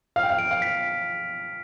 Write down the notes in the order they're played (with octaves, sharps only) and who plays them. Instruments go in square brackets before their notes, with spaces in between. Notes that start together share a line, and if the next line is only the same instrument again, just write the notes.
[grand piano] F5 [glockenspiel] F6
[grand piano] G5
F5
[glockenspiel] D7
[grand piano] F5
[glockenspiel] B6